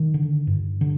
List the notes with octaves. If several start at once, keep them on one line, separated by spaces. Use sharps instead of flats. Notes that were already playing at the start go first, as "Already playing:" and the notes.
Already playing: D#3
D3
G2
D3